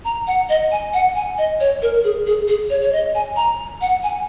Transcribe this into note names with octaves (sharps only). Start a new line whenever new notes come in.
A#5
F#5
D#5
G#5
F#5
G#5
D#5
C#5
A#4
G#4
G#4
G#4
C#5
C#5
D#5
G#5
A#5
F#5
G#5